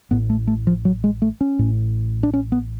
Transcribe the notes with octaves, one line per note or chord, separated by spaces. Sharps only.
A1 A2 B3
A3
A3
F3
F#3
G#3
A3
C#4
A1 A2
D4
C#4
B3